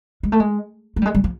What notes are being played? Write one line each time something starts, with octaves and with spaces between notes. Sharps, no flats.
G#3
A3
G#3
A3
G3
G#3
G3
F3